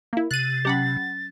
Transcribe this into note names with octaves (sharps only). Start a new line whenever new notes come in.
A#3 E4
C3 F#6 A6 D#7
F#3 C#4 G4 F#5 B5